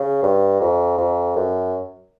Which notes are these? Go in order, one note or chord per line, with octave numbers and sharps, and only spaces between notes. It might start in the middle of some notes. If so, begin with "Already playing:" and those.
Already playing: C#3
G2
F2
F2
F#2